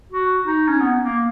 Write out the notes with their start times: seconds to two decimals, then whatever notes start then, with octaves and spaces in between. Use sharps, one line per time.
0.12 F#4
0.46 D#4
0.68 C#4
0.80 B3
1.02 A#3